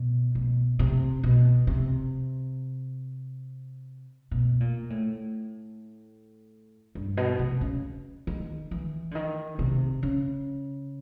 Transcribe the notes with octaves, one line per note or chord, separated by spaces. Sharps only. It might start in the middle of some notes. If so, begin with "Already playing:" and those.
Already playing: B2
B2
C3
B2
C3
B2
A#2
A2
G2
B2
C3
C#3
D#3
E3
D3
D#3
C3
C#3